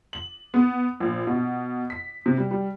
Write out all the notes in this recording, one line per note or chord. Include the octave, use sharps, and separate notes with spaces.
F#7
B3
A#1
B2
B6
C3
G3
G3